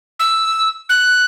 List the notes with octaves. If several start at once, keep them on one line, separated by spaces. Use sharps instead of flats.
E6
F#6